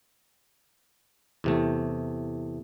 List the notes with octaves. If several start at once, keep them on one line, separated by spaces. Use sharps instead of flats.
E2 C3 A3